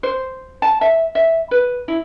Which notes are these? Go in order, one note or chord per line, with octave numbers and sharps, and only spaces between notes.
C5
A5
E5
E5
B4
E4